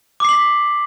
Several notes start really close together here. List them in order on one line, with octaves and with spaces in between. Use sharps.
D6 C7 F#7 B6